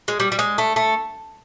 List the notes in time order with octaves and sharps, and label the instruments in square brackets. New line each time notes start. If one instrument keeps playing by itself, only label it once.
[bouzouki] G#3
G3
G3
G#3
A3
A3